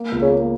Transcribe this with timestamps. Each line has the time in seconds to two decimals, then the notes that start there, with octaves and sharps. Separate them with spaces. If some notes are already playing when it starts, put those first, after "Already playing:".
Already playing: A#3
0.12 C#2
0.22 C#3
0.31 A#3